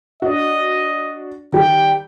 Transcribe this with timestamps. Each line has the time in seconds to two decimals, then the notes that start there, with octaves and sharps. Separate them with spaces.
0.22 D4 F#4 D#5
1.53 D#3 G3 G5